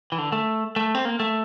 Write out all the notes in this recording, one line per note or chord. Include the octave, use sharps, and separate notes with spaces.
E3
D3
A3
A3
C4
A#3
A3